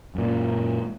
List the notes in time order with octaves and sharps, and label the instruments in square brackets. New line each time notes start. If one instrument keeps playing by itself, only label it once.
[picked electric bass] F#2 A#2